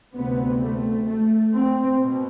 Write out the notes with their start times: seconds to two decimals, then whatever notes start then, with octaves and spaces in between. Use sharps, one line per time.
0.13 D2 C3 B3
0.61 A3
1.07 A3
1.53 C4
1.99 B2